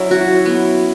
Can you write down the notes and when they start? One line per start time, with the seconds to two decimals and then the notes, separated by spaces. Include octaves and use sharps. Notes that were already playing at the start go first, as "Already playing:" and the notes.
Already playing: F#3 C#4 E4
0.11 F#4
0.46 B3